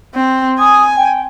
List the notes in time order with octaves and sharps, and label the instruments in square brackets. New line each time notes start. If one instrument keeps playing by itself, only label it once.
[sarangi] C4
[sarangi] G#5 [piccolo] D#6
[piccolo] G5